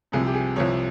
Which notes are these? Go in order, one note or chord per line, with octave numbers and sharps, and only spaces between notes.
C2 C3 F3 G#4
G4
G#4
C2 C3 F3 C#5